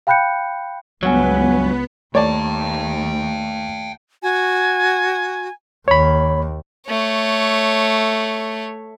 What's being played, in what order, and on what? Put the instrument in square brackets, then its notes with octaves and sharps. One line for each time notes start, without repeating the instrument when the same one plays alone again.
[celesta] F5 G5 B5 F#6 G6 C#7
[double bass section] C#2 [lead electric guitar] G2 F#3 [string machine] B3 B4 [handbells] C#5 F#5 G#5
[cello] D#2 [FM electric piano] A3 [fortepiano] C#5 D5 [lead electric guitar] G5 A5
[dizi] F#4 [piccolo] G#5
[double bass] D#2 [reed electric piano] C#5 B5
[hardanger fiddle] A3 C#5